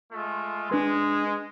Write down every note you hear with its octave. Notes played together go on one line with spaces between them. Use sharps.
G#3 A3 F4
G#3 D4 B4 C6